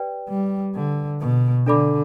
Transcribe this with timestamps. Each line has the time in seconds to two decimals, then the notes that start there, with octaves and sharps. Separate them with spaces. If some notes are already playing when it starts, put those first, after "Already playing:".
Already playing: G4 B4 D5 G5
0.29 G3
0.75 D3
1.21 B2
1.66 D3 D4 A4 D5 B5 D6